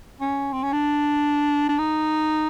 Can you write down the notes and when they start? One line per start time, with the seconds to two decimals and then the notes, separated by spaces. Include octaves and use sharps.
0.20 C#4
0.53 C4
0.63 C#4
0.73 D4
1.69 D4
1.79 D#4